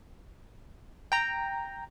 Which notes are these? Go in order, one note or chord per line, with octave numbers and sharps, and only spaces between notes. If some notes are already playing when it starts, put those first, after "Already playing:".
G5 A#5